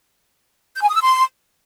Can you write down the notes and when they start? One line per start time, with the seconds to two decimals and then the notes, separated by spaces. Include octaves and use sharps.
0.75 G6
0.82 G#5
0.88 D#6
0.95 E6
1.02 C6